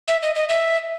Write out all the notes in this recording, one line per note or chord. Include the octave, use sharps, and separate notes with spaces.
E5
D#5
D#5
E5